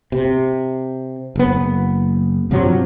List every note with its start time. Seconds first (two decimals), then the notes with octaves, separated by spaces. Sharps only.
0.12 C3
1.36 F#1 B3
2.51 G2 C3 F3 F#3